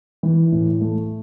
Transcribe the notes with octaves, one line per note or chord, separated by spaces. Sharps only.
E3
A2
A3